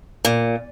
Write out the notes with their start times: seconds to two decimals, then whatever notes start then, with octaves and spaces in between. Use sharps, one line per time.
0.25 A#2